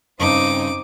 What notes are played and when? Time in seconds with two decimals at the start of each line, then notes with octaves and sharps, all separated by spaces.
0.19 G2 C#3 C4 D#4 D6